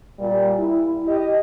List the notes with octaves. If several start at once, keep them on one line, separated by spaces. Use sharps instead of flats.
A#2 G3
E4
G4 D#5